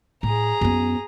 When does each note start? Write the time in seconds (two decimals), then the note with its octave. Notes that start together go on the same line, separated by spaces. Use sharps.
0.23 A2 G#4 A#5
0.61 F#2 B3